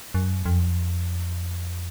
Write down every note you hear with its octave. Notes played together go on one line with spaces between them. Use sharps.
F#2
F2